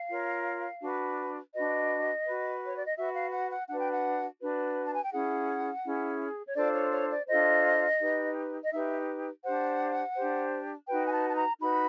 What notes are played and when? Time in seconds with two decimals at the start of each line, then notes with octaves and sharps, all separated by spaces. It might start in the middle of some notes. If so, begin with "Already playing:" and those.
Already playing: F5
0.09 F4 A#4 C#5
0.81 D4 F#4 B4
1.53 D4 F#4 B4 D#5
2.25 F#4 B4
2.66 C#5
2.76 D5
2.86 D#5
2.97 F#4 B4 E5
3.15 F5
3.33 F#5
3.50 F#5
3.69 D4 F#4 B4 F#5
3.80 G5
3.92 F#5
4.40 D4 F#4 B4
4.85 A5
4.95 G#5
5.04 G5
5.12 C#4 E4 G#4 F#5
5.85 C#4 E4 G#4
6.47 C#5
6.56 D4 F4 A4 C5 D5
6.74 C#5
6.92 C#5
7.10 D5
7.28 D4 F4 A4 C5 D#5
8.00 D#4 G4 B4
8.64 D#5
8.72 D#4 G4 B4 E5
9.44 D4 G4 C5 F#5
10.16 D4 G4 C5
10.88 D#4 F#4 B4 G5
11.04 G#5
11.12 A5
11.30 A5
11.36 A#5
11.59 D#4 F#4 B4 B5